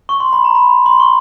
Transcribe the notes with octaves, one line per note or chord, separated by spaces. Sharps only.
C#6
C6
B5
A#5
B5
C6
C6
C#6